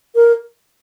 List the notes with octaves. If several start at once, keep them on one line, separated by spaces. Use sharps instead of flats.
A#4